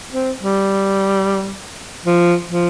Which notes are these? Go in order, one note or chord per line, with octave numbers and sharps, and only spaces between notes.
C4
G3
F3
F3